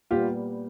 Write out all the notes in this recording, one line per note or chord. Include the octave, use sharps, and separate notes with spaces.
A#2 G3 B3 F4 G4